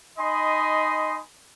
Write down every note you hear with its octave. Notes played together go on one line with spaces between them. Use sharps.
D#4 D#5 G#5 B5 C6